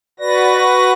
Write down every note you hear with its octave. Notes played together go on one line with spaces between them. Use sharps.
F#4 B4 D5 A#6
C#6